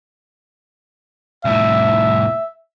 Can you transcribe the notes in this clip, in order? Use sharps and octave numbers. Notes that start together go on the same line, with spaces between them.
C2 A2 E5